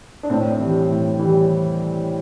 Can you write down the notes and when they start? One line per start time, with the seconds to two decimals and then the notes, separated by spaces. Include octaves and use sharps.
0.23 D4
0.30 A2 C4
0.60 E3 G3
0.90 A2
1.19 E3 G3